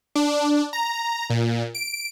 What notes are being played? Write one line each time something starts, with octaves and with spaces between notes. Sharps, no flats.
D4
A#5
A#2
D7